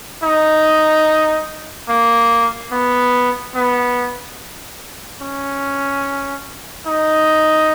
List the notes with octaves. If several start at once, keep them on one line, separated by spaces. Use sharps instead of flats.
D#4
A#3
B3
B3
C#4
D#4